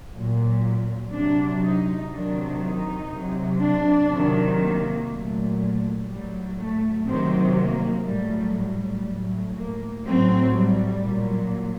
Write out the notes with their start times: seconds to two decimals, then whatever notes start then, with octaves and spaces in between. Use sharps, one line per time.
0.15 A#2 F#3
1.14 C3 F#3 D4
1.63 D#4
2.13 C3 D#3 F#3 D4
2.62 D#4
3.12 C3 F#3
3.62 D4
4.11 C3 D#3 F#3
4.60 A#3
5.10 A#2 F#3 A3
5.59 A3
6.09 A2 F#3 G3
6.58 A3
7.08 C3 D#3 F#3 C4
7.57 A#3
8.07 A2 F#3 G3
8.57 G3
9.06 A2 F#3
9.56 A#3
10.04 A2 F#3 C4
10.55 G3
11.04 A#2 F#3